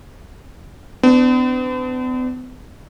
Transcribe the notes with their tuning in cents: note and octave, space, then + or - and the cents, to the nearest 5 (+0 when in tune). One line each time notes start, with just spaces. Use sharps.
B3 +45 D4 +0